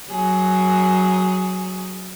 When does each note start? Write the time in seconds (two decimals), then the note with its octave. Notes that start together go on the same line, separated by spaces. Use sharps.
0.11 F#3 G#4